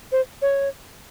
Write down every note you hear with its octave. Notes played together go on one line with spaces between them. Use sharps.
C5
C#5